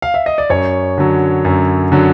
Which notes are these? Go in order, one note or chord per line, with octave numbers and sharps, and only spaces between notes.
F5
E5
D#5
D5
F#2 C#5
D3 F#3
F#2
D3 F#3